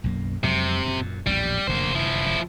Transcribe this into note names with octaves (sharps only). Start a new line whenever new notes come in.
B1 F#2 A#3
F2 C3 F#3 G#3
F#2 A#2
A#1 E2 A2 G3
F1 F#2 D3 A#3 C5
F3 E4